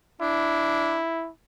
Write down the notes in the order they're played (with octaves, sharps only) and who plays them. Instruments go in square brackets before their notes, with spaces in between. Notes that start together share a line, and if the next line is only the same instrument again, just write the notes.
[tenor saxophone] D4 [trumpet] E4